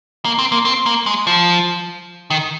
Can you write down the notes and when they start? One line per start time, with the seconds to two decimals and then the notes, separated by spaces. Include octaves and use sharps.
0.25 A#3
0.39 C4
0.52 A#3
0.65 C4
0.86 A#3
1.06 G#3
1.27 F3
2.30 D#3